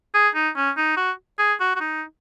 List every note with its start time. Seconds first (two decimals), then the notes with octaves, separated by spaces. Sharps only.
0.14 G#4
0.35 D#4
0.56 C#4
0.77 D#4
0.97 F#4
1.39 G#4
1.60 F#4
1.76 F#4
1.80 D#4